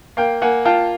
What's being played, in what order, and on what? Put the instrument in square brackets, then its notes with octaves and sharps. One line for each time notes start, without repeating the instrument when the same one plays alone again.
[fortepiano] A#3 [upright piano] F5 G5
[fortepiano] A#3 [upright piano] F#5 G#5
[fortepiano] F4 [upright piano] G5 A5